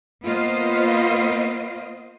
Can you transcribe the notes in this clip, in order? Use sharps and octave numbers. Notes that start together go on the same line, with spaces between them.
A#3 B3 F4 C5 D#5 F5